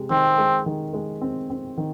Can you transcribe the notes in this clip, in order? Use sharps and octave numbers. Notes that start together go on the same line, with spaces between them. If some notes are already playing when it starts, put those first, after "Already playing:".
Already playing: C3 G#3
D#3 C4
G#3
D#3
G#3
C4
C4
D#3